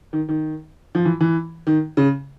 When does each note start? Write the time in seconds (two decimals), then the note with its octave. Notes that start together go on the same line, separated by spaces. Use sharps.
0.13 D#3
0.29 D#3
0.95 F3
1.05 E3
1.21 E3
1.67 D#3
1.97 C#3